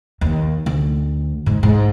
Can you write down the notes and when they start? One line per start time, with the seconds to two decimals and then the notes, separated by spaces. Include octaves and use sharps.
0.21 D#2
0.66 D2
1.46 G#2
1.63 G#2